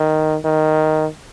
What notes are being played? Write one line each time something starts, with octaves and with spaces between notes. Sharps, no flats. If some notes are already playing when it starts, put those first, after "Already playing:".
Already playing: D#3
D#3